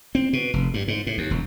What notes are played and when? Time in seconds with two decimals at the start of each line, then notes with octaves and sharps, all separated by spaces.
0.15 C4
0.33 B2
0.53 F1
0.74 G2
0.88 G#2
1.07 A2
1.18 D#2
1.31 E1